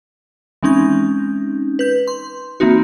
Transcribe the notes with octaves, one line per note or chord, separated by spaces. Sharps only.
E3 G#3 C4 C#4 D#4 G6
B4 G6
C6
E3 A#3 C4 D#4 F#4